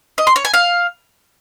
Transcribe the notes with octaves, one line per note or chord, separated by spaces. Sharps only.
D#5
C6
C#5
G#5
F5